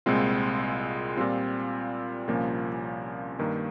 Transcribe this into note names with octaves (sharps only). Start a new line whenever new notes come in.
C2 A#2 G#3 C4 F4
A#2 G3 C4 F4
C2 A#2 F3 A#3 C#4
G2 D#3 A#3